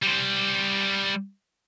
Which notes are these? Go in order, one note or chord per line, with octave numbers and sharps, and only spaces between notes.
G3 C5